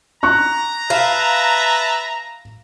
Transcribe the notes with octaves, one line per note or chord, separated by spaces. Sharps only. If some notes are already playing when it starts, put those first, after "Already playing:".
A#5 C#6 F#6
B4 E5 F5 A5